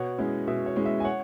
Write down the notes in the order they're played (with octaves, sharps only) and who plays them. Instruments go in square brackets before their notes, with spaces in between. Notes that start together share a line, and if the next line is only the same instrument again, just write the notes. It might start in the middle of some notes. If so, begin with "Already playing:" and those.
Already playing: [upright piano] B2 C#5 F#5
G#3 C#4 E4
B2 E5
C#5
G#3 C#4 E4
E5
G#5
C#5 F#5